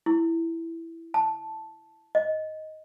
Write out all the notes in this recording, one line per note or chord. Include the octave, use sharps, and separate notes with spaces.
E4
A5
D#5